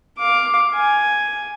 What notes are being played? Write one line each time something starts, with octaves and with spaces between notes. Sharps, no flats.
F5 D6
G#5